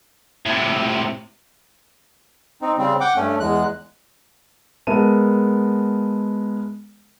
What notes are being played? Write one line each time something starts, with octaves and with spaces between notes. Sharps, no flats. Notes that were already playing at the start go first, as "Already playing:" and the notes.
A2 C3
C4 D#4
C#3 G3 C4
F#5 G5 D6
G2 A3 C#4
E2 G#3 F#6
G#3 B3 A#4 E5 A5 D#7